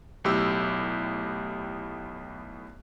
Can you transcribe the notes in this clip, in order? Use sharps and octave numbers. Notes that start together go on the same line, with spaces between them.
B1 A2 G4 E6